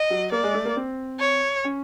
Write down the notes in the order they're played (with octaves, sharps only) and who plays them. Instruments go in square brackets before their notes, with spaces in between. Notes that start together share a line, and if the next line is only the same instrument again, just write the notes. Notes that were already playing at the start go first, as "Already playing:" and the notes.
Already playing: [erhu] D#5
[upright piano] F#3
[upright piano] A#3 [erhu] D5
[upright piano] G#3
A3
A#3
C4
[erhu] C#5
[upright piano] C#4